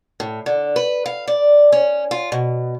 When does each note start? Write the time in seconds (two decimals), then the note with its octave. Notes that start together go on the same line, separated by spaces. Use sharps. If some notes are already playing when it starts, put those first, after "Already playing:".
0.20 A2
0.46 D3
0.76 B4
1.06 F5
1.28 D5
1.72 C#4
2.11 F4
2.32 B2